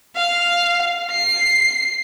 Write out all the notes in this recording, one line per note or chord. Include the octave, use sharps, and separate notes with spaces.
F5
C7